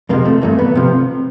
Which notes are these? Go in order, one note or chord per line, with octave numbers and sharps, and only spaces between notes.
F2 C3 F3 G#3 A#3
A3
G2 E3 A3 A#3
B3
C3 F3